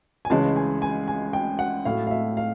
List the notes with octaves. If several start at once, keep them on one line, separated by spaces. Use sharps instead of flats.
G#5
C#2 C#3 E3 G#3 C#4 A5
G#5
G#5
G#5
G5
F#5
A2 F#3 A3 F5
F5
E5
F5